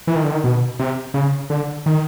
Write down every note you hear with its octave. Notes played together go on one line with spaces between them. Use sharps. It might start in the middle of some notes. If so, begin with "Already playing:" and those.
E3
D#3
D3
D#3
B2
C3
C#3
D3
D#3